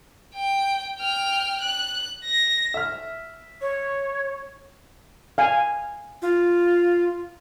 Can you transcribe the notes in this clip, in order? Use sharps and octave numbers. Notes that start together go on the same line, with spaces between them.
G5
G5 F6
F#6
A#6
E5 F6
C#5
F5 G#5
F4